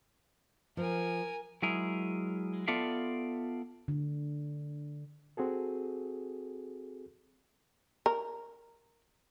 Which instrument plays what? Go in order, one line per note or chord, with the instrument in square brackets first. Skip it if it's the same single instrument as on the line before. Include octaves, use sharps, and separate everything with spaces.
[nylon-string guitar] F3 [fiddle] A#4 G#5
[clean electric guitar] F#3 G#3 E4 G#4 A#4
B3 F4 A4 D5 E5 F5
[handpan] D3
[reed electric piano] C4 F#4 G#4 A4
[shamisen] A#4